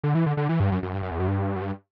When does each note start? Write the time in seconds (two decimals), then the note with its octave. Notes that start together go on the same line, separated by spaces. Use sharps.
0.03 D3
0.15 E3
0.26 D3
0.37 D3
0.49 E3
0.60 G2
0.72 F#2
0.83 F#2
0.94 G2
1.02 F#2
1.11 E2
1.20 F#2
1.28 G2
1.56 F#2
1.62 G2